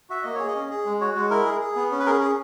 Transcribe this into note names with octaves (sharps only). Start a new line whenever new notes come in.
F#4 E5
A#3 D#5
G#4 C#5
D#5
C#4
G#4
G#3
F#4 C#5
G#3
E4 A#4
G#4
G#4
B3
C#4
B4
G#4 A#4
G#4